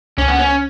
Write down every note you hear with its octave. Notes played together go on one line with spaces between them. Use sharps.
C#2 C#4
B3
C#4